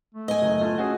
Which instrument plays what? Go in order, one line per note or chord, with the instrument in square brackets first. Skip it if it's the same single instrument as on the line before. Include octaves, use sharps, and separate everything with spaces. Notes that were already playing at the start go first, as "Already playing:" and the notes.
[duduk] A3
[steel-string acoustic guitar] D#5 G#5
[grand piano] F#1
[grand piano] A3 [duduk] F4
[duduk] C#4 [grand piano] F#4 G#4